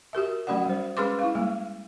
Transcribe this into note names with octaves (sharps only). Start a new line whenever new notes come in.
F#4 G4 A#4 E5
F#3 A3 C#4 F#4 D5 F#5
G3 C5
G#3 C#4 G#4 B4 C6 D6
E4 F5
G3 G#3 A#3